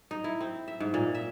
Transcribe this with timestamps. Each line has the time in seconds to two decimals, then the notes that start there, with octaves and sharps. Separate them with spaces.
0.11 D#4
0.24 E4
0.41 C4
0.68 E5
0.80 G#2
0.94 A#2
1.15 E5